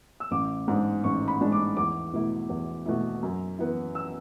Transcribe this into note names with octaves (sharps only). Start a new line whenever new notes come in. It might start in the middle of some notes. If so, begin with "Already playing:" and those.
E6
A1 D6
G#2 G#3 D4
A1 C#6
B5
G#2 G#3 D4
D6
E2 D6
B2 A3 E4
E2
B2 A3 E4
F#2
E3 B3 E4
E6